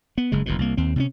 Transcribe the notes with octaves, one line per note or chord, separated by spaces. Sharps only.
B3
F#1 C#3 G#3
F#1 E2 B2
C2 A#3
D#2 C4
C3 C4 C#4